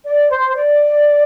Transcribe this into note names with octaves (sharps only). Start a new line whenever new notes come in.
D5
C5
D5